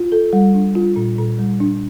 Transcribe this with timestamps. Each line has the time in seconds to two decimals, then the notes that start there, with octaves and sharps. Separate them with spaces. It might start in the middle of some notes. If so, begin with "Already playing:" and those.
Already playing: F4
0.12 A4
0.33 G3
0.54 D4
0.75 F4
0.96 A#2
1.18 A#2
1.39 G3
1.60 D4